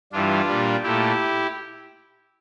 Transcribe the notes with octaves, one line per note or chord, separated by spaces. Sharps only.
G2 E3 G3 D4 F4
A#2 G3
A#2 A3 E4 G4